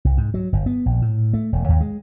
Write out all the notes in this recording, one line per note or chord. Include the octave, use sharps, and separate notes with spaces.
C2
G#2
F#3
G1
B3
A#1
A2
A3
E1
D#2
G#3